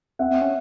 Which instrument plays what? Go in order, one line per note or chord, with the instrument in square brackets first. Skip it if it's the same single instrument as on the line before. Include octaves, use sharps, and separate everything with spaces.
[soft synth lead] C4 [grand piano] E5 F#5
[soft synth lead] C4
C#4